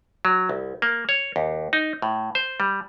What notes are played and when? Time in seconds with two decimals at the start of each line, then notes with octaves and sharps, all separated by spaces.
0.25 F#3
0.49 C2
0.82 A#3
1.09 C#5
1.36 D#2
1.73 D#4
2.02 A2
2.35 C5
2.60 G3